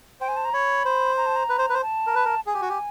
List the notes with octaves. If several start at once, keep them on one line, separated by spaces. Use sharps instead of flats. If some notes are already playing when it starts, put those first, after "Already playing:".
C5 G5
G#5
A5
A#5
C#5 B5
C5
A#5
A5
A#5
B4
C5
B4
C5
A5
A#4
B4
A#4
G#4 G#5
G4
F#4
G4